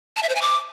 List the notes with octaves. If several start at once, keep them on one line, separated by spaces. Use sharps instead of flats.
A5
E5
C5
G#5
D6